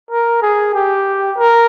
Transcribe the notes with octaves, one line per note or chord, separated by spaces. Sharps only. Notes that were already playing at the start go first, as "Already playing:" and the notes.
A#4
G#4
G4
A#4